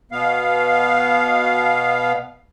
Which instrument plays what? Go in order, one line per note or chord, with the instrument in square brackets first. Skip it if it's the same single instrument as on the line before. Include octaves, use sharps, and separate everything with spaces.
[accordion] B2 B3 F5